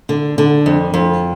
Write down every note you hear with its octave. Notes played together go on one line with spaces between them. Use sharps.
D3
D3
F2
F2